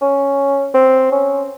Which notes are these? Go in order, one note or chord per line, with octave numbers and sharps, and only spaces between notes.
C#4
C4
C#4